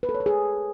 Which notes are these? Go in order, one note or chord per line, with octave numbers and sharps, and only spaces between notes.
B4
A4
C#5
B4
G#4